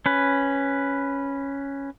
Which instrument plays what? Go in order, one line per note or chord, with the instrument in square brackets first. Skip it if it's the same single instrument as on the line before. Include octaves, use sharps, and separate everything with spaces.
[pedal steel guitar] C#4 B4